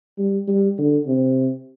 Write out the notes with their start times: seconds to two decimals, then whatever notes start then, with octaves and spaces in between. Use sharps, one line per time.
0.18 G3
0.48 G3
0.78 D3
1.07 C3